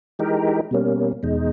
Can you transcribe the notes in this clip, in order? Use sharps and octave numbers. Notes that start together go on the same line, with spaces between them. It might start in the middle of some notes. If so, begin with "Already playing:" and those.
E3 G#3 D#4 G4 A#4
B2 G3 A#3 C#4
E2 B2 G#3 D#4